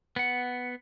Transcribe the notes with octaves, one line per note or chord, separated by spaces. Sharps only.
B3 F#5